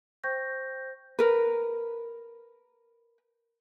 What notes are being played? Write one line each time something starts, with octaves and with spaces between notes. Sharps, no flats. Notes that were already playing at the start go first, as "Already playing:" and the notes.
C5 G5 C#6 G6 A#6
A#4 B4